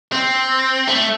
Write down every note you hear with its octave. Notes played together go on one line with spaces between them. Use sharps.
C4
A3